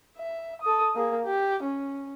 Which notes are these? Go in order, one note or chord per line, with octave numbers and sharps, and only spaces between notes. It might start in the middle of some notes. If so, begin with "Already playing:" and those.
E5
A4 D#6
A#3 G#4
G4
C#4